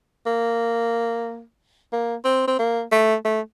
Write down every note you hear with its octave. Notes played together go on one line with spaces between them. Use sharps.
A#3
A#3
C4
C4
A#3
A3
A3